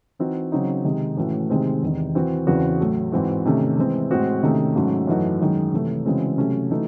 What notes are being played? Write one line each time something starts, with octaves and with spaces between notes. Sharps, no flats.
E3 C4 D#4 F#4
C#3 F#3 C4 D#4
C3 D#3 G#3 D#4
A2 E3 A3 C#4 F#4
C3 D#3 G#3 C4
E2 C3 D#3
E3 C4 F#4
E2 C#3 E3 C4 F#4
A2 F#3 A3
G#2 E3 C4 F#4
C3 D#3 A3 C#4
E3 G#3 C4
A2 G#3 C4 F#4
C3 D#3 A3 C#4
G#2 F#3 A3 C#4
F#2 E3 A3 D#4 F#4
F#2 D#3 G#3
C3 E3 A3
C#3 E3 G#3 C4 F#4
C3 F#3 A3 C#4
E3 A3 D#4 F#4